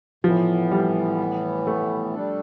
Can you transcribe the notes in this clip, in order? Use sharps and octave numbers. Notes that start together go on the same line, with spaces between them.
A2 E3 F3 B3
G3
A3
G3 D4 A4